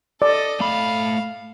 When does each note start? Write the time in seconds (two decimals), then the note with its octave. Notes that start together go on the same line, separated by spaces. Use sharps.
0.22 A4 D5 D#5
0.60 A3 F5 B5